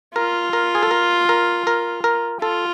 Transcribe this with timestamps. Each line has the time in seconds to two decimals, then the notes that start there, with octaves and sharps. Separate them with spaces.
0.16 F4 A#4
0.53 A#4
0.75 G#4
0.83 A4
0.91 A#4
1.29 A#4
1.67 A#4
2.04 A#4
2.42 F4 A4